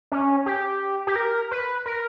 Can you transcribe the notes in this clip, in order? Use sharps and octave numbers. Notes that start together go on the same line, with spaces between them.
C#4
G4
G4
A#4
B4
A#4